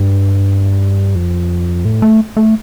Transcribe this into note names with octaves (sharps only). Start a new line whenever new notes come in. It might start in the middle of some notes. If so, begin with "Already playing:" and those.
Already playing: G2
F2
A2
A3
A3